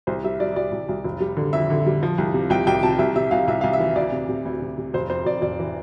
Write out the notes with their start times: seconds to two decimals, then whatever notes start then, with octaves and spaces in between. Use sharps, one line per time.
0.07 C2 C5
0.24 G3 E5
0.40 G3 D5
0.56 C2 D5
0.72 C2
0.89 C2
1.04 F1
1.20 G3
1.37 D3
1.53 F2 E5
1.70 D3
1.86 G3
2.03 F3
2.18 C2
2.34 C3
2.50 C2 G5
2.67 C2 G5
2.83 C3 A5
2.99 C2 E5
3.16 C3 E5
3.31 C2 F5
3.48 C2 E5
3.61 C2 F5
3.73 E5
3.80 E3
3.96 D2 D5
4.12 C3
4.29 C3
4.45 D2
4.62 C3
4.78 C3
4.94 F1 C5
5.09 F2 C5
5.25 F1 D5
5.42 F1 D5
5.59 E3